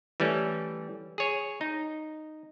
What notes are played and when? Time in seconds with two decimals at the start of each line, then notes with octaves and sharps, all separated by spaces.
0.20 E3 G3 A3 C#4
1.18 G#4 C#5
1.61 D#4